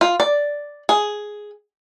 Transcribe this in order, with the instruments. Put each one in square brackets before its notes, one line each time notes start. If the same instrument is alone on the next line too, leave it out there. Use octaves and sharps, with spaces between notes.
[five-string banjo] F4
D5
G#4